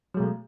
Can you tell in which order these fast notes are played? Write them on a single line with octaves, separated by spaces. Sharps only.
F#3 G#3 B2 A3